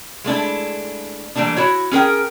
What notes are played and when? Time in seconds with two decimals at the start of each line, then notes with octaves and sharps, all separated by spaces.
0.24 G#3 A3 D4 E4
1.35 E3 G3 A3 A#3 D4
1.57 E4 F#4 C#5
1.91 C#4 G#4 A#4 G5